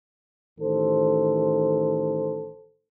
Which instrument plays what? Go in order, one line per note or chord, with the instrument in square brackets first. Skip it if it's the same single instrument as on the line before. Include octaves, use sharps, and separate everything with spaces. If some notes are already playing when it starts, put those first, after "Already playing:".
[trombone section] A1 D#3 A4 C5